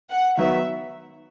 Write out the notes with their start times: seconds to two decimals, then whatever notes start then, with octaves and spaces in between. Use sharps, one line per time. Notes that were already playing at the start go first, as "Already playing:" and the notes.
0.09 F#5
0.37 D#3 F#3 B3 E5